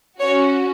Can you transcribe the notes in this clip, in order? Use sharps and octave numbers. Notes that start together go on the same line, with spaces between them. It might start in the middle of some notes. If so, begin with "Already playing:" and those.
C#4 F#4 C#5